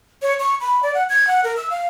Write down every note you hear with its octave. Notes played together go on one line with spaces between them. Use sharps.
C#5
C#6
B5
D5
F#5
G#6
F#5
A#4
E6
F5